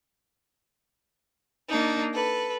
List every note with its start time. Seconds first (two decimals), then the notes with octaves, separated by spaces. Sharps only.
1.69 A#3 D4 D#4
2.13 A4 B4